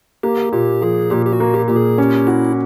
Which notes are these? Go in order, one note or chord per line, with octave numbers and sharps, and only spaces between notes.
A#3 G4
A#2 G4
F3 G#4
A#2 G4
G4
F#4
A#3
G4
A#2 G4
G#4
C#4 G4
E4 F#4